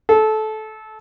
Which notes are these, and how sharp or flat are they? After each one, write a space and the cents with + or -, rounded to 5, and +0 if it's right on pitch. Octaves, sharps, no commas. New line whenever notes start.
A4 -20